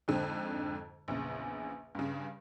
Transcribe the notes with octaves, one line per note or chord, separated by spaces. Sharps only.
F2 G#2 D3 C4
A#1 E2 C#3
G2 C#3